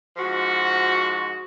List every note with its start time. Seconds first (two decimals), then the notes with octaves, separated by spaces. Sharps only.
0.17 G#2 F3 F#4